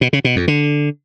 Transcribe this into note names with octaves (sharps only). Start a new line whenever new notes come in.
B2
C#3
B2
F2
D3